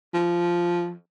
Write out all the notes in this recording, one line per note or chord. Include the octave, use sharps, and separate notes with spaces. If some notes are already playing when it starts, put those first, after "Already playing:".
F3